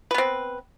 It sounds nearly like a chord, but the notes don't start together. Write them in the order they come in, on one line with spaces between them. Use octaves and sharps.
B4 B3 C4